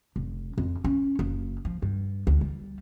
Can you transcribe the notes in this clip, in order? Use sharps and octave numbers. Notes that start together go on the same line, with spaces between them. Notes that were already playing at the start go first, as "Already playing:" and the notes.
F1
F2
C#4
F#1
F3
G2
D2
G3